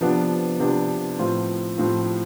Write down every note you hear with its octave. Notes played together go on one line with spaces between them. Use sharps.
C3 F3 B3 D4
C3 F3 B3 D4
A2 F3 C4 F4
A2 F3 C4 F4